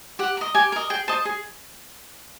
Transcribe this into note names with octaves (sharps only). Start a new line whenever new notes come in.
G4 F#5
A#4 D#5
G4 G#5
A#4 D#5
G#4 G5
C5 D#5 A5
G#4